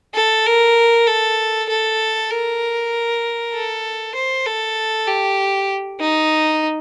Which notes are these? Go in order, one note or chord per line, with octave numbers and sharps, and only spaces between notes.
A4
A#4
A4
A4
A#4
A4
C5
A4
G4
D#4